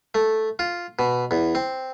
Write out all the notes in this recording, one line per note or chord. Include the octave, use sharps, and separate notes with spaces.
A3
F4
B2
E2
C4